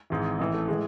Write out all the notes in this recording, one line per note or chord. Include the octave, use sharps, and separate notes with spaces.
G#1 G#2 E3
A1 A2 E3
A3
A2 E3 G#3